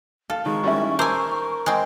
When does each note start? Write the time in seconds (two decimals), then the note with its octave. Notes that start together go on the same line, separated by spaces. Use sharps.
0.30 A4 F5
0.46 D#3 G#3 C#6
0.64 G3 C#4 E4
0.99 A#4 C5 G#5 A5 D6 E6
1.66 G#3 C4